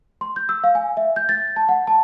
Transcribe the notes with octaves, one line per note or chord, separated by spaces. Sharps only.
C6
G6
E6
F5
G#5
E5
G6
A6
A5
F#5
A5